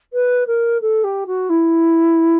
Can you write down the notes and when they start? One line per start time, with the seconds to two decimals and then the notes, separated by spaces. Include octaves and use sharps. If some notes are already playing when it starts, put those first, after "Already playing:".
0.13 B4
0.47 A#4
0.82 A4
1.04 G4
1.27 F#4
1.50 E4